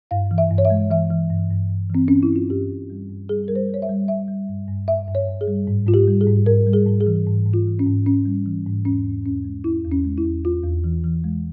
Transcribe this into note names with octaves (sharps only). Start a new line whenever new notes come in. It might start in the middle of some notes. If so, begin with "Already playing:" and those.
G2 F5
E3
E5
G2
C#5
E5
G#3
E3 E5
E3
G2
G2
G2
E3 C4
G2 C#4
E4
E3
F4
G2 G4
G2
G3
G2
G3 G#4
G3 A#4
C5
G3 C#5
E5
G3
G3 E5
G3
G2
G2
G2 E5
G2
C#5
G2
G#4
G3
G#2
G#2 F4
G4
G3
G#4
G#2
G#2 A#4
G3
G#4
G#2
G#4
E3
G#2
G#2
F4
E3
C#4
G#2
G#2 C#4
G3
E3
G#2
E2 C#4
E2
E2 C#4
G#3
E2 E4
E2
C#4
G#3
E4
E2
E2 F4
E2
E3
E3
G#3